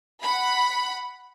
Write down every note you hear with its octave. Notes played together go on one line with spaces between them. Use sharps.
F#5 B5